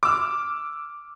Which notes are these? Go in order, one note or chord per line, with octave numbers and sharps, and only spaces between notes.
D6 E6 F6